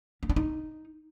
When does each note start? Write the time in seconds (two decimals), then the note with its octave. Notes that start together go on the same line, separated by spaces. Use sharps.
0.23 C#4
0.30 D4
0.36 D#4